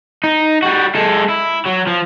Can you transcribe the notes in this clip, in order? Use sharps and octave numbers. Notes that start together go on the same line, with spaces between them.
D#4
G3 F#4
G#3 A4
E4
F#3
F3